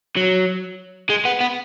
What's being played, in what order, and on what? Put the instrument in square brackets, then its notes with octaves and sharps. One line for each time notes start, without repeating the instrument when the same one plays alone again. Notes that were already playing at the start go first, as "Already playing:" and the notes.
[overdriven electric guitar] F#3
G#3
B3
B3